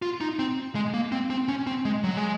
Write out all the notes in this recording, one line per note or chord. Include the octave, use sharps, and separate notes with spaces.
F4
D#4
C4
G#3
A#3
C4
C4
C#4
C4
G#3
F#3
G#3